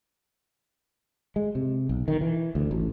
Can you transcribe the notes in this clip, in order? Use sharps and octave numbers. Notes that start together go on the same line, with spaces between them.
G#3
C3
B1
D#3
E3
D2
A1